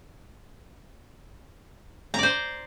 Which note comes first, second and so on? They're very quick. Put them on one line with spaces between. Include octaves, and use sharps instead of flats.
A#5 D5 C5